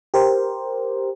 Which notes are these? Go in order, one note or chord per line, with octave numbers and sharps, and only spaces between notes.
G4 A#4 C5